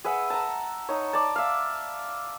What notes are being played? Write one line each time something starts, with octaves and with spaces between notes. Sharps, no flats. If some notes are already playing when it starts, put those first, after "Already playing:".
G#4 B4 E5 F#5
A5 A#5
D#4 C#5
D5 A5
E5 F5